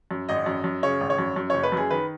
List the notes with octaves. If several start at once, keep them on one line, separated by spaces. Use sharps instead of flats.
F#2
G#1 D#5
F#2
F#2
C#3 C#5
G#1
C#5
F#2
F#2
F#1 C#5
B4
F#2 G#4
D#3 B4